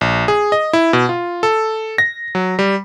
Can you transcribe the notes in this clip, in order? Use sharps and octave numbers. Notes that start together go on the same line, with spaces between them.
A#1
G#4
D#5
E4
B2
F4
A4
A#6
F#3
G3